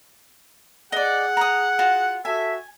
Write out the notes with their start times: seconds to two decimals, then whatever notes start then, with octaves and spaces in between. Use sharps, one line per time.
0.92 G#4 D5 D#5 F#5
1.37 A#5 D#6
1.79 F4 F#4
2.25 F#4 A4 E5 G#5